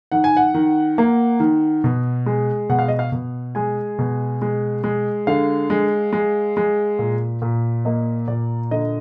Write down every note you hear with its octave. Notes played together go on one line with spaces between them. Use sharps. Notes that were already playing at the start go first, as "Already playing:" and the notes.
D#3 F#5
G#5
F#5
D#3
A#3
D#3
B2
G#3
B2 F#5
F5
D#5
F5
B2
G#3 G#5
B2
G#3
G#3
D3 F5
G#3
G#3
G#3
A#2
A#2
A#3 D#5
A#2 D5
D3 D#5